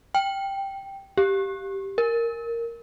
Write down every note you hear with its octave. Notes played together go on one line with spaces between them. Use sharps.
G5
G4
A#4